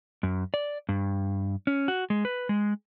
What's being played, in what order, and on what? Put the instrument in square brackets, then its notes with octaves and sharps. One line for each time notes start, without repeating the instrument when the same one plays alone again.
[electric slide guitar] F#2
D5
G2
C#4
F#4
G#3
B4
G#3